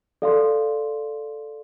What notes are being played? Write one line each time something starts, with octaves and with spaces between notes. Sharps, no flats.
A4 D5 F5 C6